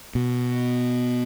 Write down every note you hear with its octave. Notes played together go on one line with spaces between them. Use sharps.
B2